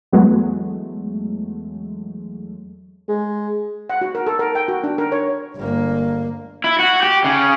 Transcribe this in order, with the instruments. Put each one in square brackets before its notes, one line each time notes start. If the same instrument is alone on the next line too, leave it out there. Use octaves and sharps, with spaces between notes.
[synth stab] E2 F#3 G#3 A3
[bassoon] G#3
[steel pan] F#5
F#4
A#4
A4
A#4
G5
F#4
D4
A#4
C#5
[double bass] G1 A#3
[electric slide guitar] E4
F#4
G4
C#3